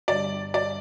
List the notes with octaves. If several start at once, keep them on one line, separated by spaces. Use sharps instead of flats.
G1 G2 D3 G3 D5
D5